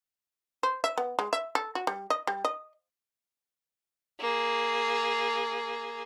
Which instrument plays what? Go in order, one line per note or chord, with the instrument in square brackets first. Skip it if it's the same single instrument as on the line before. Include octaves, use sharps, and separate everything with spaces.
[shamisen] C5
E5
B3
G#3
E5
A4
F#4
G3
D#5
G3
D#5
[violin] A#3 G#4